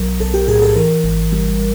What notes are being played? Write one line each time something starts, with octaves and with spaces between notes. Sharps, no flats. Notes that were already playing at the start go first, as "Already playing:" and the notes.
Already playing: B1 F#3 A#4
B1 A4
G4
A2 G#4
A4
E3 A#4
G#1
G3